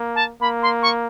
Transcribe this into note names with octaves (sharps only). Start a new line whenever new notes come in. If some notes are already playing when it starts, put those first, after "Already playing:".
Already playing: A#3
A5
A#3 B5
C6
C#6